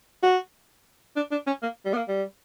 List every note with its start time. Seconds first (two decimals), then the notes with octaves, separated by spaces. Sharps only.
0.23 F#4
1.16 D4
1.31 D4
1.47 C#4
1.63 A#3
1.85 G3
1.93 B3
1.97 A#3
2.08 G3